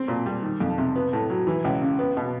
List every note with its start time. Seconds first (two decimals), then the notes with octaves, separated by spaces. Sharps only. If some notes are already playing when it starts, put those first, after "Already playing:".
Already playing: C4
0.08 A#2
0.26 G3
0.42 D#3
0.60 F2
0.78 C3
0.96 B3
1.13 A2
1.30 F#3
1.47 E3
1.64 C#2
1.81 C#3
1.99 B3
2.17 B2